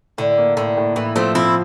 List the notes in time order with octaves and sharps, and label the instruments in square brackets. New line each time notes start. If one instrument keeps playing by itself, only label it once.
[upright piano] A2 [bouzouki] D3
[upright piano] A#3
[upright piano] A2 [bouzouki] D3
[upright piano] A2
[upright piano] A2 [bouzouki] E3
[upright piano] F3 [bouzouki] A3 C4
[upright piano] F3 [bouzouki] C4 E4